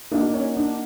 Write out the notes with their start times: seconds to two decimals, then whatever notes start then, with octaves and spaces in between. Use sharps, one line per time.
0.11 A#3 D4 D#4 F#4
0.34 C#4
0.57 D4